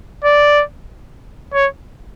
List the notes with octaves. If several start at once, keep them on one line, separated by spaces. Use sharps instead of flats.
D5
C#5